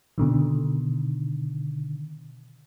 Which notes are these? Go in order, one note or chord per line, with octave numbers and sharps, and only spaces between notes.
B2 D3 D#3